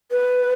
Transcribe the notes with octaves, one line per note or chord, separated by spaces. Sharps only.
B4